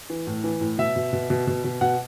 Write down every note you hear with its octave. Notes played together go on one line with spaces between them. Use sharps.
E3
A2
E3
A2
B2 E5
B2
B2
B2
B2
B2
B2 F#5